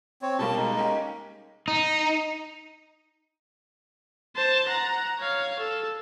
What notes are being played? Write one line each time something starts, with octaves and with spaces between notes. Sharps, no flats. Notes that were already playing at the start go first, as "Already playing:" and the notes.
C4 C#5
B2 G3 A#3 A5
G#3 D#4
A#3 C#4 G4
D#4
C5 A5
F#5 A#5
C#5 F5
A4